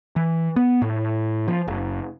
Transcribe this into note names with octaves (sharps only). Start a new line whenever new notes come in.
E3
B3
A2
F3
F#1